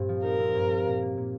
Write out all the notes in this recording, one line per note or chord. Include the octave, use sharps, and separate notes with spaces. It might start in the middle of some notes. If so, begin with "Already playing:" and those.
Already playing: G2 A#2 C4 G4
F3
D#4 A#4
C4
G2
F4
A#2
A#3
A#2